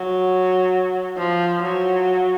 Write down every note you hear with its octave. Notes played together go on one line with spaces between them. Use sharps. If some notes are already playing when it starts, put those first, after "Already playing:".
Already playing: F#3
F3
F#3